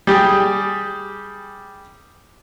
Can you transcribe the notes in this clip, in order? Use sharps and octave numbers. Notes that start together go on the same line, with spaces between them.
G3 G4 G#4